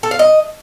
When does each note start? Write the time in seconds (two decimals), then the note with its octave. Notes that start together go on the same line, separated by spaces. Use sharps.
0.03 A4
0.11 F5
0.19 D#5